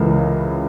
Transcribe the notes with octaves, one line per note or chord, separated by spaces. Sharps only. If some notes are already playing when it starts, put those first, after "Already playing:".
Already playing: C#2 C#3 E3 A4 A#4